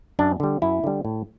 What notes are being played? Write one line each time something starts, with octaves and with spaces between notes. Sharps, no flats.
F#2 D4
D3 G3
F#2 E4
D3 G3
A2